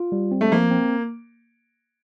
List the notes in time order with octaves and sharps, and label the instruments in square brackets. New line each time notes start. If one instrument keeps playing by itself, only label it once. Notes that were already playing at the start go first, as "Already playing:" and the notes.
Already playing: [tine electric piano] F4
G3
C4
[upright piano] A3
[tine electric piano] F3 [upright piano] A#3
[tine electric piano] C4